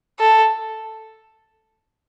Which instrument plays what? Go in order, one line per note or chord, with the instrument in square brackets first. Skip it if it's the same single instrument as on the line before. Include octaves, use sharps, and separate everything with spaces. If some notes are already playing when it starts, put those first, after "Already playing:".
[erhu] A4